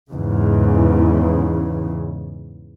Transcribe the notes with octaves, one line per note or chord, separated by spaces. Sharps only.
E2 G#2 C#3